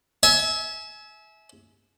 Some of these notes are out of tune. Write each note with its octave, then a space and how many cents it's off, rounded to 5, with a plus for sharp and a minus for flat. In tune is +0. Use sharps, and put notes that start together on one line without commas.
E5 -20 G#5 +25